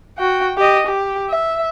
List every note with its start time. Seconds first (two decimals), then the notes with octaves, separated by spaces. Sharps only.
0.18 F#4 G5
0.58 G4 D#5
0.87 G4
1.29 E5